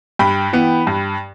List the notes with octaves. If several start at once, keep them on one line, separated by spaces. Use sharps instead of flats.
G2 G5 B5
E3 B3
G2